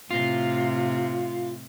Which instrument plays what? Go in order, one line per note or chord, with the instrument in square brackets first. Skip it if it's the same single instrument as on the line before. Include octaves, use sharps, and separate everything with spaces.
[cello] A2 C3 [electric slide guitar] F4